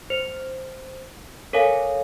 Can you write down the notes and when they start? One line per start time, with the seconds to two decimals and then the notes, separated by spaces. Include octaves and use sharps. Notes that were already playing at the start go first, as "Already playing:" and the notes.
0.10 C5
1.53 A4 A#4 C#5 F5 G#5